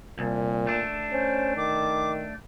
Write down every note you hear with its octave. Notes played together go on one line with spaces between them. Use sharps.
C2 A#2
A3 D4
C#4 C5
D#3 D6